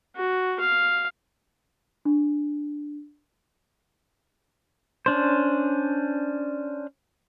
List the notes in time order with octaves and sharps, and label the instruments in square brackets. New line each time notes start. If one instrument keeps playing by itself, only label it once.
[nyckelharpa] F#4
F5
[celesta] D4
[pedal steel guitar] C#4 D4 C5